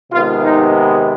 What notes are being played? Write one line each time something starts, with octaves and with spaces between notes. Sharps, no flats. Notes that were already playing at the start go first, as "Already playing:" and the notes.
C3 D#3 G#3 B3 F4
D#4